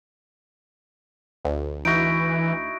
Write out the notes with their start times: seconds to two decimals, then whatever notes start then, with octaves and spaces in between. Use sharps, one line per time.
1.45 D2
1.85 E3 D#4 E4 F#4 A#6 D7